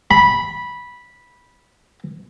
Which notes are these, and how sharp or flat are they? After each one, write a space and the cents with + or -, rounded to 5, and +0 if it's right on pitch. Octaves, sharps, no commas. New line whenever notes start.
B5 -10